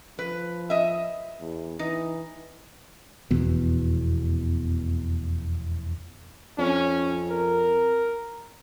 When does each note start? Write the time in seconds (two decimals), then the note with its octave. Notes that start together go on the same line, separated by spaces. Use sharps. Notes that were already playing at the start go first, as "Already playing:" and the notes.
0.19 F3 B4
0.70 D#5 E5
1.41 E2
1.79 E3 D#4
3.31 F1 E2 B2
6.59 F2 C#4
7.31 A#4